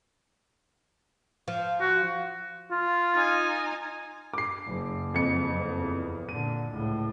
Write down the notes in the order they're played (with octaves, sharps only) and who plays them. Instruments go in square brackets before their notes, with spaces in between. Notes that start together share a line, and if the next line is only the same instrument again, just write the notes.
[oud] F3
[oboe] F#4
[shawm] F4
[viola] D#4 G#5
[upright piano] D6 C7
[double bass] F#1 F#2
[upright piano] F2 C#7
[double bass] E2
[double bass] A#2 D3 [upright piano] D#7
[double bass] C#2 A2